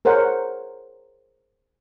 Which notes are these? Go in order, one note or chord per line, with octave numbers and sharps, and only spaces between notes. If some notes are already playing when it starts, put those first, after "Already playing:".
G#4 A#4 C5 C#5 F#5